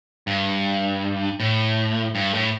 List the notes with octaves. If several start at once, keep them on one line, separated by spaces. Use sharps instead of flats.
G2
A2
G2
A2